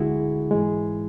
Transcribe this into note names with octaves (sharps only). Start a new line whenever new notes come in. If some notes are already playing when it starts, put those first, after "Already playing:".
Already playing: D2 D3 G#3 E4 F#4 G#4
G#2 E3 G#3